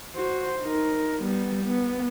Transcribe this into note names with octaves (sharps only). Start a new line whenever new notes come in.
F#4 C5
D#4 A#4
G3 B3
B3